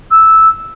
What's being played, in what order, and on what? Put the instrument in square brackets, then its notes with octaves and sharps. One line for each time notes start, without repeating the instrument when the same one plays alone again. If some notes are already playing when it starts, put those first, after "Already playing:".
[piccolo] E6